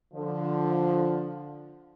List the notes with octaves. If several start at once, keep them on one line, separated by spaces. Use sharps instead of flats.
D3 F3